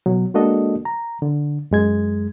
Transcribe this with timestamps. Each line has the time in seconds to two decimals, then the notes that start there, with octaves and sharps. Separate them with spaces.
0.06 B2 F#3
0.34 G#3 A#3 D4 F#4 A4 D#5
0.85 A#5
1.22 D3
1.71 F#2 G#3 G#6